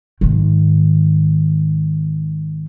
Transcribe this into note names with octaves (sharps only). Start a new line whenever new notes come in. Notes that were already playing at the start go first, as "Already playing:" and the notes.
G#2 D#3